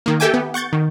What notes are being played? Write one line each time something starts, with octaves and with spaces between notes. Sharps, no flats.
D#3 A#3
G4 A4 E5 G5 G#5 D6
B3
F#5 C#6 G6 A6
D#3